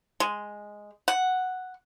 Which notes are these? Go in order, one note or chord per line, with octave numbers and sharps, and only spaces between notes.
G#3
F#5